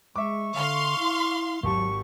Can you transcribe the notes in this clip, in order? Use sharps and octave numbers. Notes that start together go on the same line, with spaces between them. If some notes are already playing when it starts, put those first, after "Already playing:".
G#3 E5 C#6 D6
D3 F5 C6
E4
G#1 F#3 G4 A5 C#6